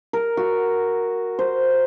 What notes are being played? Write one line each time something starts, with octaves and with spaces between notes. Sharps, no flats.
A#4
F#4
C5